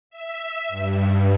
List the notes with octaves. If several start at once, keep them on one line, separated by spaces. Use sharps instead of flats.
E5
G2